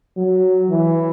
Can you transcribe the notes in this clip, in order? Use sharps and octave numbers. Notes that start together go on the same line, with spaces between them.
F#3
E3